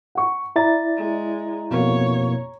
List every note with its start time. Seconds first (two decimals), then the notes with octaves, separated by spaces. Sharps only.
0.15 F#5 C#6
0.56 E4 D5 A#5 A6
0.97 G#3
1.71 F2 B2 A#3 C#5